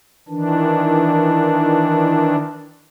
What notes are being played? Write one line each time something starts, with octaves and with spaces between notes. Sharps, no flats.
D#3 E3 D4